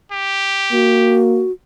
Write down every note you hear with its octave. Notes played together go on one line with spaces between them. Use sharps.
G4
A#3 F#4